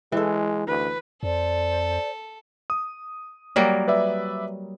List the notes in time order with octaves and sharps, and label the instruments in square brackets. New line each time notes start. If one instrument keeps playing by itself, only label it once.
[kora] E3 A4 [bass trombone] G#3
[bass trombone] D2 [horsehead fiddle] B4
[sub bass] F2 [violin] A4 [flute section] C5 D5
[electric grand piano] D#6
[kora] F#3 G3 A#3
[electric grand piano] B4 D5 E5